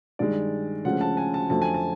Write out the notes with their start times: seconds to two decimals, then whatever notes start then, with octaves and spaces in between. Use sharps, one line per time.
0.19 G2 D#3 G#3 D5
0.85 D2 C#3 F3 G#3 C#4 F#5
1.01 A5
1.17 G#5
1.34 A5
1.50 F2 D3 F#3 A3 A5
1.62 G#5
1.74 A5